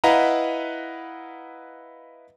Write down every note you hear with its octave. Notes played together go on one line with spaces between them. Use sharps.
E4 B4 D#5 F5 F#5 A#5